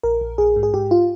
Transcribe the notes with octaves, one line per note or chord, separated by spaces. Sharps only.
A#1 A#4
A#1
A#1 G#4
G#2
G#4
G#2 G4
F4